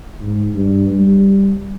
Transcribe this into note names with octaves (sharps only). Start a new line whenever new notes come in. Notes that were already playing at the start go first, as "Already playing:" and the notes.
G#2
G2
G3